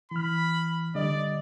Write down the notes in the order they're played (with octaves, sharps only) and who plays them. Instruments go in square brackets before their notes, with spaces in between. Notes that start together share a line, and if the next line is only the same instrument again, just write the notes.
[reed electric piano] E3 F6 [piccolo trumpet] B5
[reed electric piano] D3 G3 D#5 [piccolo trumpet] D5